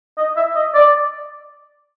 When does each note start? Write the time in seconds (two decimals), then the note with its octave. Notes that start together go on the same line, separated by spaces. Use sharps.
0.17 D#5
0.37 E5
0.55 D#5
0.74 D5